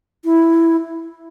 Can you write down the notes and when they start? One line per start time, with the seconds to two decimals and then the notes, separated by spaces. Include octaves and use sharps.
0.25 E4